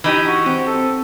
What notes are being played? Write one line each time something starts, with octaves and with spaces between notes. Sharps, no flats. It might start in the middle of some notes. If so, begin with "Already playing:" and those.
E3 D#4 G4
F#4
C4 G4
A4